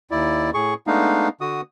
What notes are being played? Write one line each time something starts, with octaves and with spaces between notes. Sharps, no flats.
D#2 E4 D5
A2 G#4 C#6
G#3 A3 B3 D4 D#4 F5
D3 F#4 D#6